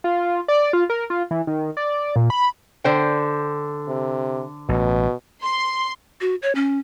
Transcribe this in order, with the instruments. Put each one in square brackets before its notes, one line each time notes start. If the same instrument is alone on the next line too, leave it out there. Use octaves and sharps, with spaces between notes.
[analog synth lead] F4
D5
F4
A#4
F4
E3
D#3
D5
A#2
B5
[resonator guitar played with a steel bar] D3 C5 G5
[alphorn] C3
[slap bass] A1 [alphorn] B2
[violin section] C6
[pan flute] F#4
C#5
C#4